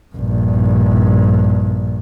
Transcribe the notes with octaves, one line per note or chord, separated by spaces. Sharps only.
A#1 G2